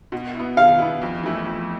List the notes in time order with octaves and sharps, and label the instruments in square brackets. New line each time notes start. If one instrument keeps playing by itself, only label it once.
[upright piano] B2
B3 E4
[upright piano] B2 [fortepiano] F5
[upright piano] B3 E4
F2
E3 A3 E4
F2